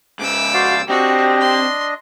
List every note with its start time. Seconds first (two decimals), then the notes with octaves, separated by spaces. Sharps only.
0.19 G#2 C#3 D6 E6
0.54 F#4 C5 D5 F5
0.89 C4 D4 F#4 G4 D#5
1.41 C6